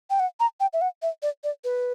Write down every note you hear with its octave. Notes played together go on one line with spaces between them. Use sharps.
G5
F#5
A#5
G5
E5
F#5
E5
D5
D5
B4